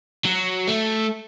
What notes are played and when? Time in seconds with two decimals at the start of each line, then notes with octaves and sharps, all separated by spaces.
0.25 F#3
0.67 A3